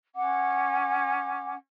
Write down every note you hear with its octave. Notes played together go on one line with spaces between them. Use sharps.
C#4 F#5 D6